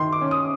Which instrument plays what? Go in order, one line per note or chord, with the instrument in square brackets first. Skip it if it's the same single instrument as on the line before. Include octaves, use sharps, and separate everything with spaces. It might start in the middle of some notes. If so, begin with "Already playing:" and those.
Already playing: [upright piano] D#3 [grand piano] C6
[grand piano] D6
[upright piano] C#4
[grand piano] D#6